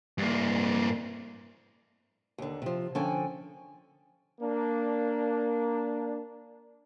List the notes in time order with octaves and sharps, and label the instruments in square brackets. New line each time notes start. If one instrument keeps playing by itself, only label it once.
[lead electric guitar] G2 A#3
[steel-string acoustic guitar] D#2 D3
C3 F3
D3 F3 C#4 A4 G5 G#5
[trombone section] A#3 D4